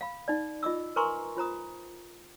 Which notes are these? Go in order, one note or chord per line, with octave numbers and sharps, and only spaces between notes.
F5 B5
D#4 D5
F4 D#5 D6 E6
A#4 B4 G#5 A#5 C6 C#6
F4 C5 A#5 D#6